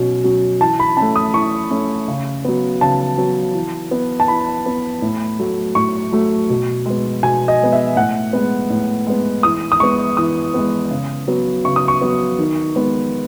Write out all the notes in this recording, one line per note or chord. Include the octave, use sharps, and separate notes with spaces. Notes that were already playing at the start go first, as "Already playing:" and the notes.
Already playing: B2 F#3 C#4
F#3 C#4
E3 A5
B5
A3 C#4 A5
D#6
E3 C#6
A3 C#4
C#3
F#3 B3
C#3 A5
F#3 B3
E3
B3
A5
E3 B5
B3
A2
F#3 A3
A2 C#6
F#3 A3
B2
G#3 B3
B2 G#5
D#5
G#3 B3
E5
A2 F#5
G#3 B3
A2
G#3 B3
E3 D#6
D#6
G#3 B3 C#6
E3 D#6
G#3 B3
C#3
F#3 B3
C#3 C#6
D#6
C#6
F#3 B3
D#3
G#3 B3